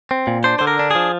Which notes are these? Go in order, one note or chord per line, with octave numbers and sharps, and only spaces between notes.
C4
A#2
D4 C5
D3 C5
A#4
D4
F3 G#4